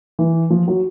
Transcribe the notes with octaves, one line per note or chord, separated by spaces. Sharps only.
E3
F3
F#3